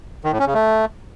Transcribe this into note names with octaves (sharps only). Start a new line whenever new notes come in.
D#3
A2
C#4
C#3
A3